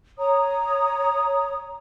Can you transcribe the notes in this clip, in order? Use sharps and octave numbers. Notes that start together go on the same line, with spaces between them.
C#5 A#5 D#6